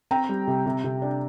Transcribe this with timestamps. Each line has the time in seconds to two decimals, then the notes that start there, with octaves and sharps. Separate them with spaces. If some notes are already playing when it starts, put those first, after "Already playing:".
0.11 C4 G5 A#5
0.29 G3
0.47 C3
0.66 C3
0.84 C3
1.02 D4